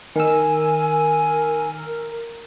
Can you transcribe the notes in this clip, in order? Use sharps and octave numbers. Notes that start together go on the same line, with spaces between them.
D#3 A#4 G#5 E6